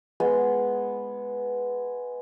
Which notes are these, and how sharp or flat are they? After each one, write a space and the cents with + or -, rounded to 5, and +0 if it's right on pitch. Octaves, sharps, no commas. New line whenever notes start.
G#3 +0 B3 +0